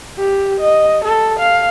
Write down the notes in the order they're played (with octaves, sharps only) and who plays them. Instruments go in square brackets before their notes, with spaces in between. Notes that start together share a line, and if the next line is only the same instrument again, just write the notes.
[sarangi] G4
D#5
A4
F5